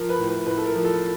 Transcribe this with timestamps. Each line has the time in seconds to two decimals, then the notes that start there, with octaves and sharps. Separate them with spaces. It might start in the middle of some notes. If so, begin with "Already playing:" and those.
Already playing: F3 A#4
0.09 B4
0.19 A2
0.28 B4
0.46 A2 B4
0.58 A4
0.66 A#4
0.75 F3
0.84 A4